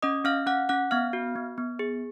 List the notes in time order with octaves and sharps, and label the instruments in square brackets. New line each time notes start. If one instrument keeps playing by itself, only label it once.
[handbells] C#4 D#5 D#6
C#4 F5 F6
C#4 F#5 F#6
C#4 F#5 F#6
B3 F5 F6
F#4
B3
B3
G#4